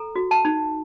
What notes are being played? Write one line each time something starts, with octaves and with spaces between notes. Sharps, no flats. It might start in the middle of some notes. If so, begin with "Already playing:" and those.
Already playing: A4 A#5
F#4
A5
D#4